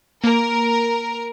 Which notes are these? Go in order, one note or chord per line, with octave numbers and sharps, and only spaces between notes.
A#3 A#4